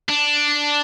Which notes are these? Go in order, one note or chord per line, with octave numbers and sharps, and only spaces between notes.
D4